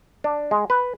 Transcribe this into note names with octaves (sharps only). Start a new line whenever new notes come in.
D4
G#3
B4